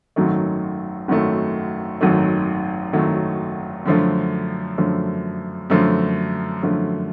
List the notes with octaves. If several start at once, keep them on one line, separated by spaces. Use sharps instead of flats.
G#1 F#2 D#3 F#3 A3
G#1 F#2 D#3 F#3 A3
G#1 F#2 D#3 F#3 A3
G#1 F#2 D#3 F#3 A3
F#2 D3 F3 A3
F#2 D3 F3 A3
F#2 D3 F3 A3
F#2 D3 F3 A3